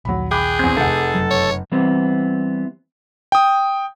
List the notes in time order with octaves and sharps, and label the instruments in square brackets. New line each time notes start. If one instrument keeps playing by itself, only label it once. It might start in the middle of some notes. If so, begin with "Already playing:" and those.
[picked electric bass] A#1 D#2 [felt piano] F#3 B5
[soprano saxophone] G#4 [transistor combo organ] G5 [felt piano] B5 D6 F#6
[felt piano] E2 G6 [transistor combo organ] C4
[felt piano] F1 F#5 [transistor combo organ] A4
[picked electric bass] F#1 F#3
[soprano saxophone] C#5
[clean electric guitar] E3 G3 B3 C4
[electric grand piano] G5 D#6